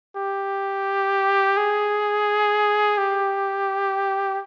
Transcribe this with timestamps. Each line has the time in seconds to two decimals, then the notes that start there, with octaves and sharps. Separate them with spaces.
0.16 G4
1.57 G#4
2.98 G4